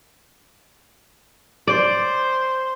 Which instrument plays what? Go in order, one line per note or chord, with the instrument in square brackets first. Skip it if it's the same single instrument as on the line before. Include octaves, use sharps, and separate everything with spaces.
[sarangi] C5 [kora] D5